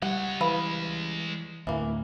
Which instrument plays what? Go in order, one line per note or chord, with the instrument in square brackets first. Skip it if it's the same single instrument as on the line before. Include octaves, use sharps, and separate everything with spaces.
[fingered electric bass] G3 [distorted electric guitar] G#3 C#5 [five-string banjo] F#5
[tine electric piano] E3 [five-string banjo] B4 F5 B5
[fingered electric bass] D2 A2 [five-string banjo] E3 A#3